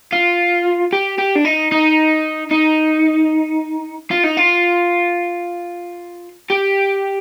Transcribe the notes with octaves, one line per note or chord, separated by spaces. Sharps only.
F4
G4
G4
D4
D#4
D#4
D#4
F4
D#4
F4
G4